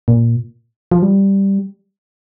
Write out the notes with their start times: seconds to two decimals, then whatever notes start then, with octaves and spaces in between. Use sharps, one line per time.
0.08 A#2
0.91 F3
1.02 G3